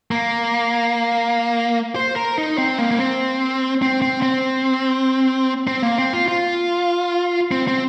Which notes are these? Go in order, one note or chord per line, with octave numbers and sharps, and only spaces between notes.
A#3
C5
A#4
D#4
C4
A#3
A#3
C4
C4
C4
C4
C4
A#3
C4
F4
F4
C4
C4